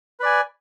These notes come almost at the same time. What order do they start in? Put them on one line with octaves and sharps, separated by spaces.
B4 D5 G#5